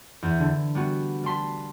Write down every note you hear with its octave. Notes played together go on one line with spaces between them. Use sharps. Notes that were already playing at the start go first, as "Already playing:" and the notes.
E2
D3
G3 B3 F#4
G3 A5 C6 B6